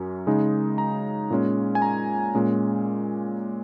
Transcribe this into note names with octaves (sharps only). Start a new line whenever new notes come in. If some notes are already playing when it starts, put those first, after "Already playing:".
Already playing: F#2 F#3 C#4
C#3 G#3 D#4
A#5
A#2 G#3 C#4
G#5
A#5
A#2 G#3 C#4